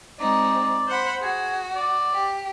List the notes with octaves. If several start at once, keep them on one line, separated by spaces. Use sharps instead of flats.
G#3 C4 D#4 D5
C5 F#5 B5
F#4 G#4
D5
G4